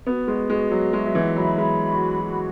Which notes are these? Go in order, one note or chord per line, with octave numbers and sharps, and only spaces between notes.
B3 F#4
G#3
G#3 F#4
F#3
G#3 E5
F#3
E3
F#3 B5
G#3
F#4
F#4